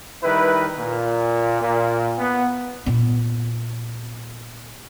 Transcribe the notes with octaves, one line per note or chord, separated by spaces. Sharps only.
D#3 G3 E4 B4
A#2
A#2
B3
A#2 B3